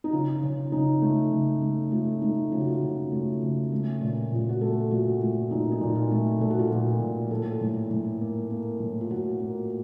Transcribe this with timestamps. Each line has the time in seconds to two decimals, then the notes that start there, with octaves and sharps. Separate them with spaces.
0.04 D#4
0.12 C#3 F4
0.43 C#3
0.72 C#3 D#4
1.02 A3
1.32 C#3
1.62 A3
1.92 A3 F4
2.21 A3 D#4
2.52 C#3 F4
2.61 F#4
2.68 F4
2.81 C#3 F4
3.12 A3
3.42 C#3
3.72 A3
4.01 A#2
4.32 A#2 F4
4.49 F#4
4.61 A3 A4
4.91 A#2 F#4
5.21 A3 F4
5.51 A#2 D#4
5.72 D#4
5.81 A#2
5.95 F4
6.11 A3
6.40 A#2 A4
6.50 F#4
6.59 F4
6.67 A#2 F#4
7.00 A#2
7.31 A2 A4
7.61 A2
7.90 A2
8.21 A#3
8.50 A#3
8.80 A2
9.01 F4
9.10 A2 F#4
9.40 A#3